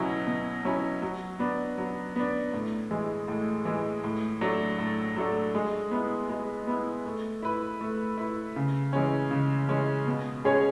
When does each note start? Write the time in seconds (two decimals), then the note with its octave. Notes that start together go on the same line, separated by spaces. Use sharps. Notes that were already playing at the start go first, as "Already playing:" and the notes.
Already playing: B2 F#3 C#4 E4
0.27 B2
0.65 F#3 C#4 E4
1.02 F#3
1.39 B3 D4
1.78 F#3
2.16 B3 D4
2.53 A2
2.91 E3 G#3
3.28 A2
3.65 E3 G#3
4.04 A2
4.41 F#3 A3 D4 A4
4.79 A2
5.16 F#3 A3 D4 A4
5.55 G#3
5.91 B3 E4
6.29 G#3
6.67 B3 E4
7.06 A3
7.42 E4 B4
7.81 A3
8.18 E4 B4
8.56 C#3
8.93 E3 G#3 C#4
9.31 C#3
9.68 E3 G#3 C#4
10.07 B2
10.44 G#3 C#4 G#4 C#5